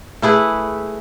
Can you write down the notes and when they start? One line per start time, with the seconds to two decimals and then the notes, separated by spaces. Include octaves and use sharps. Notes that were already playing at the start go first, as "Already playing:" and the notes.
0.22 A3 E4 G#4 B4